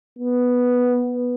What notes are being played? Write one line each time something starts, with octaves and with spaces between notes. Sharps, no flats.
B3